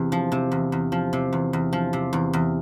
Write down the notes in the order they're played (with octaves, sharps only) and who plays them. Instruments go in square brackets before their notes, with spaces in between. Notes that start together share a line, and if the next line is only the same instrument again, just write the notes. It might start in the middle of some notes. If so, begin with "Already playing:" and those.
Already playing: [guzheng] E2 C3
F3
C3
E2
E2
F3
C3
E2
E2
F3
C3
E2
E2